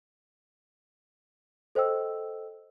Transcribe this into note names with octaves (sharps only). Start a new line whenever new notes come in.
A4 C5 D#5 G5 E6